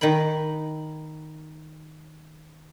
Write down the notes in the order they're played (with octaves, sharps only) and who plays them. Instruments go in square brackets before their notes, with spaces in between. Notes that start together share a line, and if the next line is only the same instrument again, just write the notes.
[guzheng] D#3 B4 G5 B5